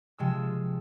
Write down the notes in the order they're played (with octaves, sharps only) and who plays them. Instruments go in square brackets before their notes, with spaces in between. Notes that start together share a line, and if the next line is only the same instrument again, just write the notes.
[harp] C3 F3 G#3 E6